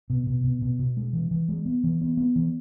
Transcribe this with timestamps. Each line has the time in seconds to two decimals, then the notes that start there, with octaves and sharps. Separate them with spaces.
0.10 B2
0.27 B2
0.44 B2
0.62 B2
0.79 B2
0.97 G#3
1.13 E3
1.31 E3
1.49 G#3
1.65 B3
1.84 E3
2.01 B3
2.17 B3
2.36 E3